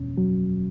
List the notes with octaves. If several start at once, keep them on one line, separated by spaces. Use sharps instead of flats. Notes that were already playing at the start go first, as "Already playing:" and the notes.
Already playing: E2 B2 C#4
F#3